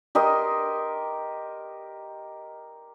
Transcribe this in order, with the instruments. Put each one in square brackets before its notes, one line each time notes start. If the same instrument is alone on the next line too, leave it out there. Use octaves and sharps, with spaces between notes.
[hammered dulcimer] G4 A#4 D#5 C6